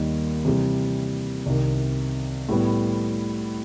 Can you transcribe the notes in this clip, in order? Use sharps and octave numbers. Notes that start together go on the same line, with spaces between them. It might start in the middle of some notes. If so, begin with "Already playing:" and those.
Already playing: D#2 D#3 G3 D#4
C3 E3 G3
C2 C3 D#3
A2 G3 B3